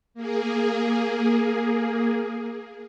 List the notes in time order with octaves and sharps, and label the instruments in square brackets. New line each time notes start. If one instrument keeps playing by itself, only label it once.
[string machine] A#3 G#4